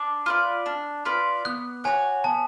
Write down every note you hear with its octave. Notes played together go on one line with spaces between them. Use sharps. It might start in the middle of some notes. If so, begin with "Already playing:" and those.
Already playing: D4 D6
F4 B4 D5
D4
F4 B4 D5
B3 F#6
F#4 C#5 F#5 G#5
B3 A5